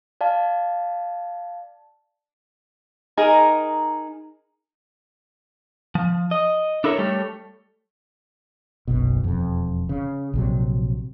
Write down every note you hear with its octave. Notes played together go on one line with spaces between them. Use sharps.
D5 F5 A5
D#4 G#4 A#4
F3
D#5
D4 E4 A4 A#4 C5 C#5
G3 A3 G4 A4 C#5
F#1 B1 B2
E1 F2
C#3
A#1 C3 F#3